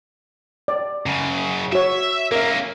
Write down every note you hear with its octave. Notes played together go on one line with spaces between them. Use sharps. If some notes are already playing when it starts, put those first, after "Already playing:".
D5
F#2 C#3
F#4 C#5 E5
A#3 C#4 A#4 E5